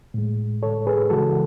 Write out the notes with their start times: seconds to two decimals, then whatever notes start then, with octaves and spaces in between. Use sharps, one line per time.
0.14 A2 G#3
0.63 A4 C#5
0.86 G#4 B4
1.10 C#3 E3 G#3 F#4 A4